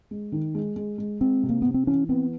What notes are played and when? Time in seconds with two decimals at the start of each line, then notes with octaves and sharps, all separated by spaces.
0.11 G#3
0.32 D#3
0.55 G#3
0.76 G#3
0.98 G#3
1.20 G#3 C4
1.43 C3
1.49 A#3
1.62 C3 B3
1.74 C4
1.87 E3 C#4
2.09 B3 C4